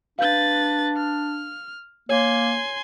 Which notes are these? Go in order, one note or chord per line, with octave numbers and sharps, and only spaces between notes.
D4 B4 F5 G6 A6
F6
A#3 C#5 G#5 C6